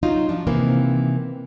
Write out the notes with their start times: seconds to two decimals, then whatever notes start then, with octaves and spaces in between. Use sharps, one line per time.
0.03 F#3 D#4 F4
0.29 F3 D4
0.47 C3 D#3 E3 A#3 C4